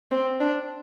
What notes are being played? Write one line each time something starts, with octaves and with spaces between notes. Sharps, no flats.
C4
D4